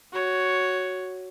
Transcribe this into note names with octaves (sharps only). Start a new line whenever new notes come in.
F#4 C#5